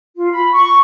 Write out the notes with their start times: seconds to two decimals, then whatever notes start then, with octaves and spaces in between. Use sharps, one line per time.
0.17 F4
0.32 B5
0.52 C#6